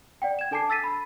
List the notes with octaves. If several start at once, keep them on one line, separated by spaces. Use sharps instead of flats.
D5 F#5 G5
G#6 E7
D4 A4 G#5 A5 D6 C7
E6 A6 B6 D#7
B5